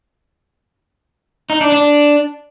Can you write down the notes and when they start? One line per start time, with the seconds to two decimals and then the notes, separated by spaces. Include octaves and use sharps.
1.50 D#4
1.61 D4
1.72 D4